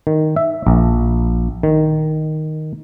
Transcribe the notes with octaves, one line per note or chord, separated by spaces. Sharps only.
D#3
E5
A#1
D#3